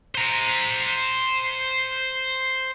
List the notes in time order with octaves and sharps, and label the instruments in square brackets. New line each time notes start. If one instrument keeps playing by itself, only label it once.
[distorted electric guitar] C5 A#5